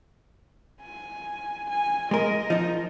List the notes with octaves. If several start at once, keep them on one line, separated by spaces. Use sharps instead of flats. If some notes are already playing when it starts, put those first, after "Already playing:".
G#5
G#5
G#3 A#4 D#5
F3 D#4